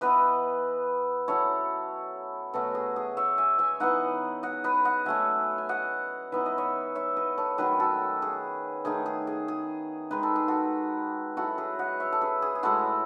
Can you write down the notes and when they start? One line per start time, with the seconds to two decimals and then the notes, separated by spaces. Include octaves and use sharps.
0.01 E3 B3 E4 B4 D#5
1.28 F#3 C#4 E4 A4 C#5
2.54 B2 F#3 A3 C#4 F#4 A4
2.75 G#4
2.96 G#4
3.17 C#5 E5
3.38 E5 G#5
3.59 E5 G#5
3.80 E3 B3 D#4 D#5 F#5
4.43 D#5 F#5
4.64 B4 D#5
4.85 D#5 F#5
5.05 F#3 A3 C#4 E5 G#5
5.58 G#5
5.69 D#5 F#5
6.32 E3 B3 D#4 E5
6.46 D#5
6.58 C#5 E5
6.95 C#5 E5
7.17 B4 D#5
7.38 A4 C#5
7.58 D#3 F#3 A3 C#4 G#4 B4
7.80 F#4 A4
8.22 G#4
8.85 D#3 A3 D#4 G#4
9.06 G#4
9.27 G#4
9.48 G#4
10.11 D#3 G#3 D#4 B4
10.23 A4
10.36 G#4
10.48 F#4 A4
11.37 F#3 C#4 E4 F#4 A4
11.58 G#4 B4
11.79 D#5 F#5
12.00 C#5 E5
12.12 A4
12.21 G#4 B4
12.42 G#4
12.55 G#4
12.63 A2 G#3 C#4 E4 F#4 A4